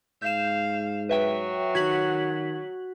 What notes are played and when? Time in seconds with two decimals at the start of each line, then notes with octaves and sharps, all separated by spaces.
0.22 G#2 F5 G6 E7
1.09 F#3 B4 E5 G5
1.75 D#3 F#4 G#6 B6 F#7